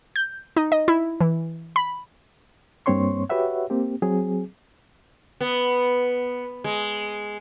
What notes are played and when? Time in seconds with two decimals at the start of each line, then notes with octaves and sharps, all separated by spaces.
0.16 G6
0.57 D#4
0.72 D#5
0.88 E4
1.21 E3
1.76 B5
2.86 G2 A#3 C4 C#5 C6 C#6
3.30 F#4 G4 B4 C#5 E5 F#5
3.70 A#3 C4 G4
4.02 F#3 C4 G#4
5.40 B3
6.64 G#3